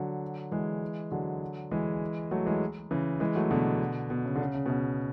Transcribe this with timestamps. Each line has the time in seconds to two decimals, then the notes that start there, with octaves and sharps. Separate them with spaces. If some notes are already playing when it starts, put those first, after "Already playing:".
Already playing: D3 F#3
0.51 E3 G#3
1.12 D3 F#3
1.71 E3 G#3
2.31 F#3 A3
2.46 E3 G#3
2.91 C#3 E3
3.20 E3 G#3
3.35 F#3 A3
3.51 B2 D3
4.10 B2
4.25 C#3
4.36 D3
4.41 C#3
4.54 C#3
4.66 B2
4.70 C#3